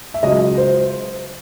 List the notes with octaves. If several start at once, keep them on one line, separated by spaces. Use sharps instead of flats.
E5
C#2 C#3 F#3 D#5
C5